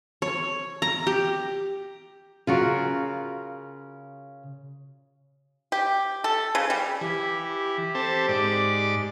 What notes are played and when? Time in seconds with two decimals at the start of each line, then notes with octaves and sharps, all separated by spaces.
0.22 C#5
0.82 A#5
1.07 G4
2.47 C#3 F4 F#4 A#4
5.72 G4
6.24 A4
6.55 C#3
6.70 G3
7.01 E3 G4
7.95 C4 A4
8.28 G#2 D5